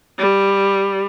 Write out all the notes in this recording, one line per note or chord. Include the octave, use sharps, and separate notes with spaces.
G3